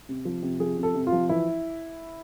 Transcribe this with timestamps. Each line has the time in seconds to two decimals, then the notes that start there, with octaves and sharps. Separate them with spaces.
0.09 C3
0.25 F3
0.43 C3
0.60 F3 G#4
0.78 C3
0.83 A4
0.95 C3
1.07 F4
1.12 F3
1.29 E3 E4